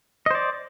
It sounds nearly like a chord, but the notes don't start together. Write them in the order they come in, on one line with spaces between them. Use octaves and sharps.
D#5 C5 D5